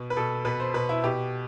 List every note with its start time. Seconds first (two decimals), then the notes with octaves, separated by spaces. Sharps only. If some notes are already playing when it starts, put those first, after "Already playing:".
Already playing: B2
0.10 B4
0.17 B2 A4
0.45 B2 B4
0.60 C5
0.74 B2 B4
0.89 E4
1.03 B2 G4